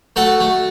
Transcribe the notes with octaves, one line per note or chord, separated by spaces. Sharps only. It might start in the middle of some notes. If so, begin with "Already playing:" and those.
A3 F#4 A4
A3